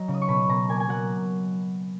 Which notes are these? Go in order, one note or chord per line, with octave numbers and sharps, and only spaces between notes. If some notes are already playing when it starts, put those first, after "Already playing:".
Already playing: F#3 D#5 A#5
C#3
D#6
C#6
B2 B5
B2 A#5
A#3 G#5
G#5
F#3 F#5